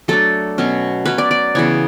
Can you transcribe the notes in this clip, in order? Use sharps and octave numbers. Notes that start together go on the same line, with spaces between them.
F#3 A3 D4 A4
B2 F#3 C#4
F#3 C#4 B4
D5
D5
C#3 E3 B3 C#5